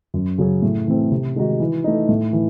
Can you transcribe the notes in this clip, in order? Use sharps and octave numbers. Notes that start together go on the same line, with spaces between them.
F#2
C#3 F#3 C#4 G#4
A2
E3 A3 C4
C3
D#3 G#3 D#4 F#4
E3
A3 D#4
A2
E3